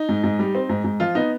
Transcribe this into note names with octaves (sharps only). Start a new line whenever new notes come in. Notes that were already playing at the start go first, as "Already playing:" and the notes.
Already playing: D#4
G#2
G#2
G3
C4
G#2
G#2
F3 F4
B3 D#4